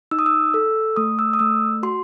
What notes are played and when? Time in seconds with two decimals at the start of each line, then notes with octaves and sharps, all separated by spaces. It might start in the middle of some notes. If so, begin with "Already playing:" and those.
0.11 D#4 E6
0.19 D#6
0.26 E6
0.54 A4
0.96 A3 D#6
1.19 E6
1.33 D#6
1.39 A3 E6
1.83 F#4 C6